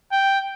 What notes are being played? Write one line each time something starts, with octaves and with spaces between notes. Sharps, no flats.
G5